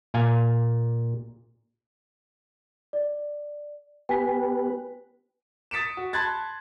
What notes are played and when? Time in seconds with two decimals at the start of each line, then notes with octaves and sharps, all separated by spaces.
0.14 A#2 F5 G#5
2.93 D5
4.09 B3 G4 B4 G5 G#5 B6
5.71 D#6 A6 B6 C#7 D7 E7
5.97 F#4
6.13 A5 B5 C6 F#6 G#6 A6